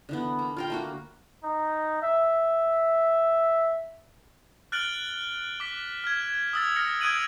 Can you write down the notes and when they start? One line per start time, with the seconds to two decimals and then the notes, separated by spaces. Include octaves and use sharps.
0.09 D3 E3 B3
0.39 A#3
0.57 F4 A#4 G5
0.70 A3 A#3 F#4
1.44 D#4
2.02 E5
4.72 F6 F#6 A6 D7 F#7 G7
5.60 D6 B6
6.04 F6 G#6
6.53 D#6 E6 A6
6.76 F6 A#6 C#7
7.01 D#6 F#6 G#6 D7 D#7 F#7